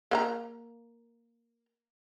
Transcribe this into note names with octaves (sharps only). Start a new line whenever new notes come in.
A#3 F#5 A#5